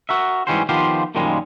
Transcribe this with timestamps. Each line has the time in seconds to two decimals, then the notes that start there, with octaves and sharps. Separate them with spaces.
0.09 F#4 A#4 E5
0.47 G#2 E3 G3 C#4 F#4 C5
0.69 D#3 F3 B3 F4 G4 C5
1.15 F#2 A#2 D#3 F3 G3 G#3